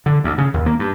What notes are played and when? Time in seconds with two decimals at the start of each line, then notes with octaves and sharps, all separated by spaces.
0.06 D3
0.24 D2
0.38 C#3
0.54 D#2
0.66 A#3
0.79 G2